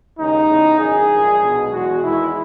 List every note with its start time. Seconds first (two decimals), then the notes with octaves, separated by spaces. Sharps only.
0.19 D#2 C#3 G#3 D#4
0.50 E2 C#3 E3
0.80 G#1 F#2 D#3 G#4
1.11 A#1 A#2 G#3
1.42 B1 B2 G#3
1.72 E2 B2 G#3 F#4
2.03 E2 D#3 G#3 E4